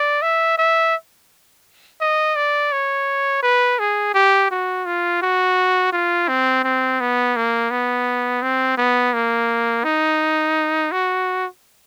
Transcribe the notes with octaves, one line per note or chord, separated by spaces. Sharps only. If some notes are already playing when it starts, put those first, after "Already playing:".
Already playing: D5
E5
E5
D#5
D5
C#5
B4
G#4
G4
F#4
F4
F#4
F4
C4
C4
B3
A#3
B3
C4
B3
A#3
D#4
F#4